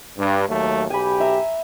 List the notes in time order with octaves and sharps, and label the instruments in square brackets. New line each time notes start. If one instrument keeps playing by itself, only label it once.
[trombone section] G2
D#2 F#3 A3
[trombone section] B1 G4 [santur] G#5 B5
[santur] E5 A#5